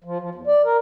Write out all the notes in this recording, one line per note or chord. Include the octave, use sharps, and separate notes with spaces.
F3
F3
E2
D5
A#4